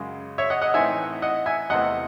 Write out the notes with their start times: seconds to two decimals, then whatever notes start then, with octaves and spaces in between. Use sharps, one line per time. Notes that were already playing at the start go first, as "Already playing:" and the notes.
Already playing: F#2 C#3 G#3
0.38 C#5 E5
0.50 D#5 F#5
0.61 D#5 F#5
0.74 A2 E3 C4 D#4 E5 G#5
1.22 D#5 F#5
1.46 E5 G#5
1.70 E2 C3 E3 A3 C4 D#5 F#5